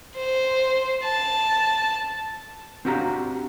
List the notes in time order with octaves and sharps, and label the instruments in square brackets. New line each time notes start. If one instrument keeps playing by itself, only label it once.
[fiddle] C5
A5
[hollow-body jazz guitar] C4 D4 F#4 G4 F5 A#5